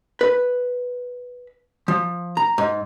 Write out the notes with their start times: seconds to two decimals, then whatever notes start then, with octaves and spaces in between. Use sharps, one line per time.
0.21 B4
1.88 F3
2.37 A#5
2.58 G#2